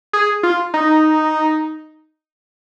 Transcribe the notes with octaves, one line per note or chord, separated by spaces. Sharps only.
G#4
F4
D#4